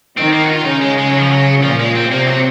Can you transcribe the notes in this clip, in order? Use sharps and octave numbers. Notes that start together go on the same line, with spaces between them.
D#3 C4
A#3
F#4
F4
C#3 D#4
G#3
G#3
F#3
F3
F#3
A#2 F3
G#3
C4
C3 A#3
F#3